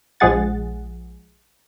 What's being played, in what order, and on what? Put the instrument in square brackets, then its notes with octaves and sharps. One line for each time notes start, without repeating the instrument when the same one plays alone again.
[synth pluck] A#1 F3 G#3 G#4 F#5 A6